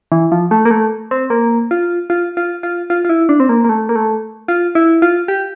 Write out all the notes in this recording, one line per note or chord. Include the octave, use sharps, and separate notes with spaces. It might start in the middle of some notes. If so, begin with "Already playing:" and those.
E3
F3
A3
A#3
A3
C4
A#3
F4
F4
F4
F4
F4
F4
E4
D4
C4
A#3
A#3
A3
A#3
A3
F4
E4
F4
G4